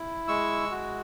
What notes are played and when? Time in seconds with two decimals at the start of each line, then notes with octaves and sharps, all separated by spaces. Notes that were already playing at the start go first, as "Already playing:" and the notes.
Already playing: E4
0.28 G#3 C#6 E6
0.71 F#4